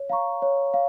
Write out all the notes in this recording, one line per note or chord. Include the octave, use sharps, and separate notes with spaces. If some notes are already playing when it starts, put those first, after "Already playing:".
Already playing: C#5
F5 A#5 C#6
C#5
F5